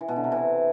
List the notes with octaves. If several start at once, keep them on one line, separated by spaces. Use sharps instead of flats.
E3
B2
D3
C3
E3